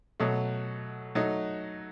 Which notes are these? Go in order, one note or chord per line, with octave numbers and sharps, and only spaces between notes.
B2 F#3 A3
F#3 A3 D#4